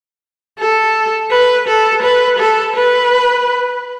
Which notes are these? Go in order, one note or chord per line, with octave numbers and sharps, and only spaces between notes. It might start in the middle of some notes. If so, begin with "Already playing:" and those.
A4
B4
A4
B4
A4
B4